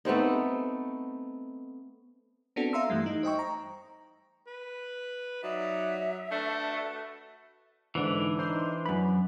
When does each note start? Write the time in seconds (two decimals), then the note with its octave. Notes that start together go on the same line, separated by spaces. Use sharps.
0.05 A3 B3 C4 D#4
2.56 B3 C4 D4 F#4 A4
2.73 E5 F5 A#5 C6 E6
2.90 G2 E3 G3 A3
3.06 D#4
3.23 C5 D#5 G5 C#6
3.39 A#5
4.47 B4
5.43 F#3 D#4 D5 E5 F#5
6.31 A3 D4 F#4 B4 A5
7.95 G#2 D3 E3 D4
8.38 D#4 C5 C6
8.86 F#2 B4 B5